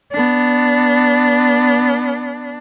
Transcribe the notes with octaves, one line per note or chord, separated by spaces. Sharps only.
B3 D4